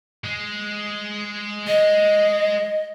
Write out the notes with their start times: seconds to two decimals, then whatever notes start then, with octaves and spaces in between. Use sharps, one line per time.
0.24 G#3
1.67 G#3 D#5